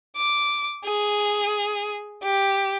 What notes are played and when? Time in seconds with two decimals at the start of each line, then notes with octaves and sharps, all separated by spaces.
0.17 D6
0.85 G#4
2.23 G4